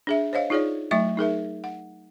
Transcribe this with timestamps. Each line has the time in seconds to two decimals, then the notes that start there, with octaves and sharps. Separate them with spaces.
0.07 D4 G#4 E5
0.33 C5 C#5 D#5 F5
0.50 D#4 F4 G#4 C#5 D5
0.91 F#3 A3 E5 C#6
1.17 D#4 G#4 A#4 E5
1.64 F#5